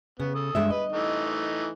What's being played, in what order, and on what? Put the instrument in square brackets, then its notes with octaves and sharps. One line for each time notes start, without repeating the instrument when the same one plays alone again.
[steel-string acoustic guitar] C#3 [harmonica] B3
[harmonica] A4 D#6
[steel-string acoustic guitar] G2 G#3 E5
[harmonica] B4 [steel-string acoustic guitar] D#5
[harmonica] E3 A3 D#4